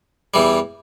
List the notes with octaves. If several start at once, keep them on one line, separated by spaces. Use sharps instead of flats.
E2 E3 G3